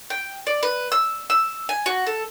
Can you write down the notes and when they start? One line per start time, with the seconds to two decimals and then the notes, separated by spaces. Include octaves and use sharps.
0.10 G5
0.47 D5
0.63 B4
0.92 E6
1.30 E6
1.69 G#5
1.86 F#4
2.07 A4